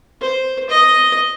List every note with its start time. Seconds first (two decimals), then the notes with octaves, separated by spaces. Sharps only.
0.21 C5
0.69 D#5